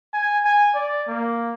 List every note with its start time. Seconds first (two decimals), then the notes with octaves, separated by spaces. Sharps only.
0.13 G#5
0.45 G#5
0.75 D5
1.08 A#3